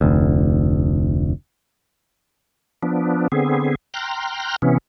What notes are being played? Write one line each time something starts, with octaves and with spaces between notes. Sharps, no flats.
F1 D2
F3 B3 D4
D3 B3 C4 G#4
G5 A#5 C6 F6 F#6
C3 E3 B3 C#4